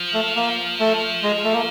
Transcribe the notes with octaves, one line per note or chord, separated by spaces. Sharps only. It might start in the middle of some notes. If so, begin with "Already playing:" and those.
Already playing: F3
A3
A#3
A3
G#3
A3
A#3